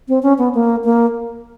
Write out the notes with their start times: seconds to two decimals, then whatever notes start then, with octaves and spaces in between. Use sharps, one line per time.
0.08 C4
0.23 C#4
0.38 B3
0.54 A#3
0.84 A#3